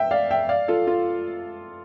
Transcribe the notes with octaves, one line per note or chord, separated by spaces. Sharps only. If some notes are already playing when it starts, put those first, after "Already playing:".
Already playing: E5 G5
D5 F5
E5 G5
D5 F5
F4 A4
F4